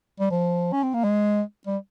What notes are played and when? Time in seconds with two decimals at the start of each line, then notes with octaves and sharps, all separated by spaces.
0.20 G3
0.31 F3
0.72 C#4
0.83 C4
0.94 A#3
1.04 G#3
1.66 G3